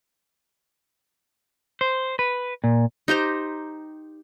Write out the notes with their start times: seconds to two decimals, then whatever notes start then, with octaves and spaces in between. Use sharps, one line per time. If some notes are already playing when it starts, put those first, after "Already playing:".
1.81 C5
2.19 B4
2.64 A#2
3.08 D#4 G4 C5 A#5